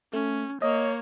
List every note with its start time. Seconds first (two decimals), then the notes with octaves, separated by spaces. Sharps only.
0.13 A3 C#4
0.62 A#3 C#5 D#5